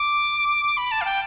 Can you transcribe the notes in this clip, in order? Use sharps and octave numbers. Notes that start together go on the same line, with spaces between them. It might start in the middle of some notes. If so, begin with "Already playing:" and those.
Already playing: D6
B5
A5
F5
G5